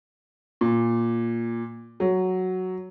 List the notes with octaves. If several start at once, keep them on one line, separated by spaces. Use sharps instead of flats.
A#2
F#3